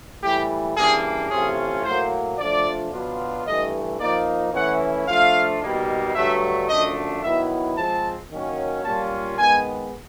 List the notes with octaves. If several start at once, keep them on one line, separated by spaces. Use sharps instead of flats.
A2 E3 G3 G4
C#3 E3 G3 A#3 D4 G#4
C3 E3 A3 C#4 F4 G#4
A2 F#3 A#3 C5
F3 A3 D4 F4 D5
B2 F#3 B3 D4 F4
G2 E3 A3 D#5
F3 A#3 D#4 D5
E3 A3 C#4 E4 F#5
F3 A3 D4 F4 F5
B2 G3 A#3 D#4
G2 D3 F#3 A3 E5
F#2 D3 F3 A3 D4 D#5
D#3 F#3 B3 E4 E5
F3 G#3 C4 A5
D#3 F#3 A#3 C#4
A#2 G3 A#3 C#4 F4 A5
D#3 G#3 B3 G#5